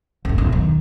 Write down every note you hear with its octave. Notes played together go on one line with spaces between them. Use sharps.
F#1 G2
E1 B1
D#3